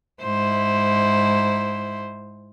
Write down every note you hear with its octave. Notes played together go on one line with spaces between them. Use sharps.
G#2 E4 C5